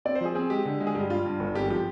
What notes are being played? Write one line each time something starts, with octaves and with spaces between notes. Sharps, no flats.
C4 D5
C5
F3 G#4
C4 G#4
G#3 G4
D3
G#3
G#4
G2 G4
G3 F4
G2
G1
G#1 G4
F3 G4